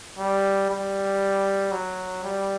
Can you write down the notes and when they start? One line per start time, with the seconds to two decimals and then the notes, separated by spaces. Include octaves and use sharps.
0.19 G3
0.70 G3
1.71 F#3
2.23 G3